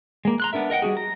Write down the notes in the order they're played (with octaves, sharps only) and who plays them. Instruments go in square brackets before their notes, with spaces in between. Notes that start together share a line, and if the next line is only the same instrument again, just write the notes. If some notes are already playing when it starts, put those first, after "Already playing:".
[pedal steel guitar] G#3 A#3
A#5 C6 F#6
B3 D4 A#4 E5
A#4 D#5 F#5 G5
G3 D4 F#4 G#4
A#5